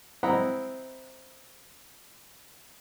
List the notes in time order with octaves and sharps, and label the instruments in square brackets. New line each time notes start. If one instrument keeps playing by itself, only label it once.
[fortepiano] C4 E4 D#5 F#5 A#5 B5